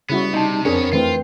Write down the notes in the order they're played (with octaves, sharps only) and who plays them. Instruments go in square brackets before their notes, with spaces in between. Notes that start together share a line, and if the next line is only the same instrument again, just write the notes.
[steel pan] C#3 E4 F#4 [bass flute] G3 [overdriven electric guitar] B3
[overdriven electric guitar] C3 [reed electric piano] D#4 A5
[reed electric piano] F2 A#4 [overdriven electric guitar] B3 C#5 [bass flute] C4 [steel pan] D4 G#4
[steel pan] E3 A3 C4 [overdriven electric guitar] F4 [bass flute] B4